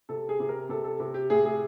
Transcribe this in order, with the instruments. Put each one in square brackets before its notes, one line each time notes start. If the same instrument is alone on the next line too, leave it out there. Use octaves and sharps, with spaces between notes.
[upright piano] C3 A4
G#4
C3
A#4
C3 A4
A4
C3
G4
A2 G#4
G#4